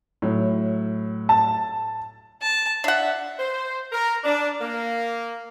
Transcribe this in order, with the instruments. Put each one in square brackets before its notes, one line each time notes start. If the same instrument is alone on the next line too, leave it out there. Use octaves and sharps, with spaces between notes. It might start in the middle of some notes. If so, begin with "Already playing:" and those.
[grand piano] A2 F#3
[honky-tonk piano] A5
[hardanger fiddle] A5
[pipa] D4 F#5 [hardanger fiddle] E5
[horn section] C5
A#4
D4
A#3